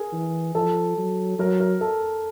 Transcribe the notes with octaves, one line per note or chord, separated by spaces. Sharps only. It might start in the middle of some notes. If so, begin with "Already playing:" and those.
Already playing: G#4 A#4
E3
F3 A4
F#3
F#3 A#4
A#4
A4